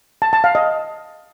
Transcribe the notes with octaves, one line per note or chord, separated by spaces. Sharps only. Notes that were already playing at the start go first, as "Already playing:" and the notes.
A5
A5
F5
D#5